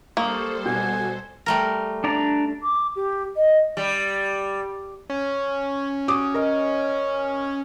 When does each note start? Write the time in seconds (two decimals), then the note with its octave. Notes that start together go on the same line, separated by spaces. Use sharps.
0.17 G3 A#3 A4 C5 C#6 D#6
0.66 B2 F#4 G#5
1.46 G3 A3 A#4
2.04 D4 D5 A#5
2.63 D6
2.96 G4
3.37 D#5
3.77 G3
5.10 C#4
6.08 F#4 D6 D#6
6.34 A#4 D#5